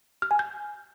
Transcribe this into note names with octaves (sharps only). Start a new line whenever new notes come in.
F6
G#5
G6